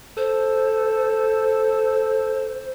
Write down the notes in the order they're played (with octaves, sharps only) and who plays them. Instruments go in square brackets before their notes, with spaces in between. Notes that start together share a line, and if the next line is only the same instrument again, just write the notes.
[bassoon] A4 [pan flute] C5